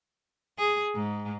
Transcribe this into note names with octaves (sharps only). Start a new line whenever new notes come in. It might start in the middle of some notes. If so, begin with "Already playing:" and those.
G#4
G#2